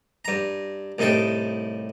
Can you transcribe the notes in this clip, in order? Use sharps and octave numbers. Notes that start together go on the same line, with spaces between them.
G2 A#5
C2 A2 D#4 A4 G5